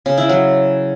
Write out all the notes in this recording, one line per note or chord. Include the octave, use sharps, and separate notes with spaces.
C#3
E4
F#3